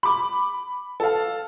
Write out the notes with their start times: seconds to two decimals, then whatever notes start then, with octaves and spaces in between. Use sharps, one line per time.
0.03 B5 D6
1.00 A4 F5